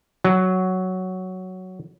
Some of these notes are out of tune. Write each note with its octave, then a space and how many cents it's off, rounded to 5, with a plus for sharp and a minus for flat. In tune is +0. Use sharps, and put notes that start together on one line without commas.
F#3 +5